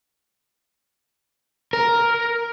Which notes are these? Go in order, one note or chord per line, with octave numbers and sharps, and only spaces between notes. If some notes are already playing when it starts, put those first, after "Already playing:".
A#4